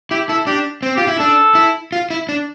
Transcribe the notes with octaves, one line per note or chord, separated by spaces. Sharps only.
E4 G4
E4 A4
D4 G4
C4
F4 G4
E4
D4 A4
E4
F4
E4
D4